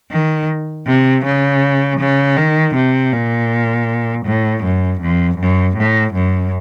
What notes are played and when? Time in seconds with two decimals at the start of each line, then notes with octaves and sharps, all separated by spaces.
0.11 D#3
0.87 C3
1.25 C#3
2.00 C#3
2.37 D#3
2.75 C3
3.12 A#2
4.26 A2
4.64 F#2
5.00 F2
5.38 F#2
5.77 A2
6.14 F#2